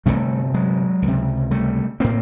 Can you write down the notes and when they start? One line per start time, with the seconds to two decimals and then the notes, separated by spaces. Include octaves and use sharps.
0.06 G1 F2 C3 G3 A3
0.54 F#3 G#3
1.02 C#2
1.07 C3
1.51 G3 A3
2.00 A2 A#3 C4